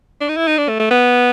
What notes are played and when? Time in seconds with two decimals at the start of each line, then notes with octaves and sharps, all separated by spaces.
0.21 D4
0.28 D#4
0.36 E4
0.47 D#4
0.58 D4
0.68 A3
0.79 A3
0.90 B3